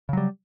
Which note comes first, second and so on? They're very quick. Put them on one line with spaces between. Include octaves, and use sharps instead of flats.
C#3 F#3 G3